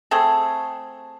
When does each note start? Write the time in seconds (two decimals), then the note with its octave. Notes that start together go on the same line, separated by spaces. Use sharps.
0.11 A3 C4 G#4